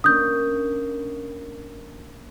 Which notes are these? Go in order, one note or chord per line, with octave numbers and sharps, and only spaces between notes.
A#3 C#4 D4 D#6 G6